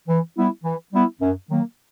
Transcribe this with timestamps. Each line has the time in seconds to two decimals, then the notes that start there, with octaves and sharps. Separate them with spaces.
0.08 E3
0.36 G3 B3 E4
0.64 E3
0.92 G3 B3 E4
1.20 F#2
1.48 D#3 F#3 A#3